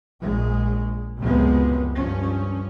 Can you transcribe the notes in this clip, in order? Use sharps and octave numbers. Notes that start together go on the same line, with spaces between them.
A#1 G#3
C#2 F#2 C3 F3 G#3 B3
G2 F3 C#4